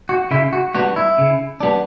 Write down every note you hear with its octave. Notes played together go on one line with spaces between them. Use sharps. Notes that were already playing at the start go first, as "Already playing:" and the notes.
F#4
C#3 E4
F#4
G3 B3 D4 F#4
E4
C#3
G3 B3 D4